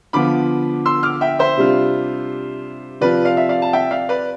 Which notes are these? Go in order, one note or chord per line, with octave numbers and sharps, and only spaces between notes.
D3 F3 B3 F4 B5 D6
C6 E6
D6 F6
E5 G5
C5 E5
C3 G3 D4 F4
C3 F3 C4 F4 B4 D5
D5 F5
E5
D5 F5
A5
E5 G5
D5 F5
B4 D5